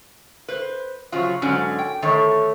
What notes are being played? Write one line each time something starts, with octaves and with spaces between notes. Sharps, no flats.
B4 C5
C#3 F3 F#3 F4
G#2 D3 F#3 C#4 D5
G5
D3 D#3 A3 C#5